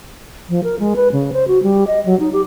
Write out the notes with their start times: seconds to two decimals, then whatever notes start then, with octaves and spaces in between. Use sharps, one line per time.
0.49 F3
0.64 A#4
0.79 G#3
0.96 B4
1.12 C#3
1.33 C5
1.48 F#4
1.63 G3
1.87 D#5
2.06 F#3
2.20 D#4
2.33 G4